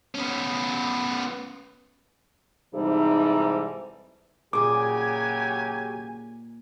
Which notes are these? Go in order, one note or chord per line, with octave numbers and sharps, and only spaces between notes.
B3 C#4
G#2 C3 E3 G3 D#4 A4
A#2 C#3 F#3 G4 G#4 G#5 D6